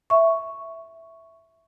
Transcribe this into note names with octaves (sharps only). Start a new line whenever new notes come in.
E5 C#6